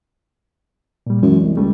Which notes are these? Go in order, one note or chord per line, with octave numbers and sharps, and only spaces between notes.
A#2 G3
F#2 E3 G#3
C2
C#2 G3 A3